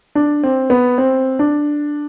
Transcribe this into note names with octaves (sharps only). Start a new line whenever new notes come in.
D4
C4
B3
C4
D4